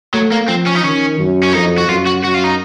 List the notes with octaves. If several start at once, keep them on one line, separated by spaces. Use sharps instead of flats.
F#3 A3
A#3
F3 C4
C#4
D#4
D#3 C#4
F#2
C#4
F2 D#4
F#4
F#2 F4
F#4
F#2 F#4
F4
D#4